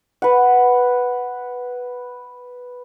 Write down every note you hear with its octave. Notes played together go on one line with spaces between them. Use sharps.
B4 F#5